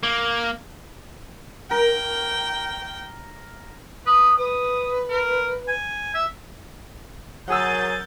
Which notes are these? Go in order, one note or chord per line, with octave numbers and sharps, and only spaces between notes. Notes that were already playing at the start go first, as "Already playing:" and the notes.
A#3
A#4 G5
B4 D#6
B4 D#6
A#4
G#5
E5
F#3 G#4 A#4 F#5 E6 G6 A6